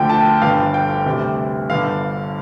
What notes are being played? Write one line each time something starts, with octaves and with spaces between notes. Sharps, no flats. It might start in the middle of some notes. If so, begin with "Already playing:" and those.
Already playing: D2 D3 F3 A3 G5
A5
G1 G2 D3 F5
G5
D2 C3 G3
G1 G2 D3 F5